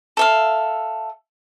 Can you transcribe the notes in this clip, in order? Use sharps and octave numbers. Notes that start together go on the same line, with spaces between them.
A4 E5 F5